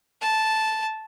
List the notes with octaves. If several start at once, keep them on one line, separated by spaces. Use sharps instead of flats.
A5